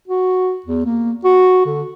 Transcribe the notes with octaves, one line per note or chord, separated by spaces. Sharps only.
F#4
E2
A#3
F#4
D3